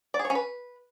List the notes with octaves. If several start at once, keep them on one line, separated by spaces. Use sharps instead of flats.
D5
G#4
C#5
C#4
B4